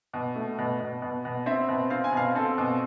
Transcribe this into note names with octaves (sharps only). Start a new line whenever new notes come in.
B2
A3
B2
B2
B2
B2
C4 E5
B2
C4 F5
G#5
B2 F5
C4 A4
B2